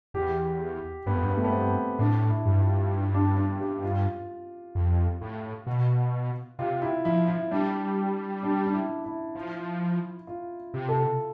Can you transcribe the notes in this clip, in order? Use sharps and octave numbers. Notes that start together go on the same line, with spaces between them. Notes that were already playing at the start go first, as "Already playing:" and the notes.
E2 G4
G2 B3
F2
G2
B3
A3
B3
C4
A2 D4
E4
G2
F4
D4
D4
G4
F4
F2
A2
B2
C3 F4
E4
F3 E4
E4
G3 D4
D4
D4
E4
E4
F3
F4
C3
A4